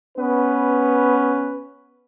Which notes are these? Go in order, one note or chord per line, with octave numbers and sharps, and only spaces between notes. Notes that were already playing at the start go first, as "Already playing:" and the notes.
B3 C#4 B4